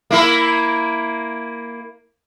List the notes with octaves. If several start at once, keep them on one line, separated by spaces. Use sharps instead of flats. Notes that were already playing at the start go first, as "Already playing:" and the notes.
A#3 E4 A#4